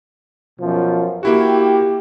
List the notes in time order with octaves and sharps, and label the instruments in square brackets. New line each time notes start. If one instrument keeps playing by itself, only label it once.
[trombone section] F#2 B2 F3
[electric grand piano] A#3 E4 F#4 [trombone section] G4